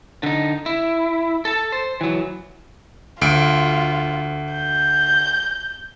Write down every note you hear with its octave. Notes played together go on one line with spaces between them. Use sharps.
D3 D#4
E4
A4 A5
C5
E3 F#3
D2 F4 D7
G6